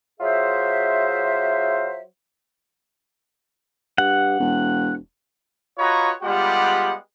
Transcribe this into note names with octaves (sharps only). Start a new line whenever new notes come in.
F#3 F4 G#4 C5 E5
G2 F#5
E1
F4 F#4 B4 C#5 D#5 A#5
G3 G#3 B3 F4 G4 F#5